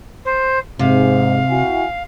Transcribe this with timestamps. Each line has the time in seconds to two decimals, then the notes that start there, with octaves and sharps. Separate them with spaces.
0.25 C5
0.79 G#2 C3 F5
1.50 E4 F#4 G#5